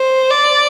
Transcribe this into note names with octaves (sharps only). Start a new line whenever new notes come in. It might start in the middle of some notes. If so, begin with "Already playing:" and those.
Already playing: C5
D5